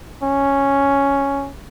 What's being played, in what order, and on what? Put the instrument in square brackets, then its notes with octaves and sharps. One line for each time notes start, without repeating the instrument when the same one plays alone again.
[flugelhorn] C#4